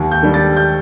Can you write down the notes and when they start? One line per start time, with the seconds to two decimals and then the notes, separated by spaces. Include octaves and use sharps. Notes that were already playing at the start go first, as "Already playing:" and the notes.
Already playing: D#2
0.12 G6
0.23 D#3 G3 D4
0.34 A6
0.57 G6